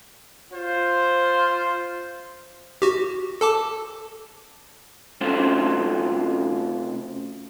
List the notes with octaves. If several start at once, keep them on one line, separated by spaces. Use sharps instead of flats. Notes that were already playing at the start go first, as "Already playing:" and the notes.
F4 C5
F#4 G4
A4 A5 D6
C3 A3 C#4 F4 A4 C5